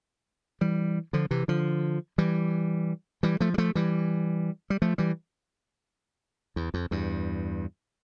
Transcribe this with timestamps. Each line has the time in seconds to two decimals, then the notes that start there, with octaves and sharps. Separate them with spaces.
0.61 E3 G3
1.13 D3 F3
1.31 C3 E3
1.48 D3 F3
2.18 E3 G3
3.23 E3 G3
3.40 F3 A3
3.54 G3
3.58 F3 A3
3.75 E3 G3
4.70 G3
4.82 F3 A3
4.98 E3 G3
6.56 E2
6.74 F2
6.91 E2 G2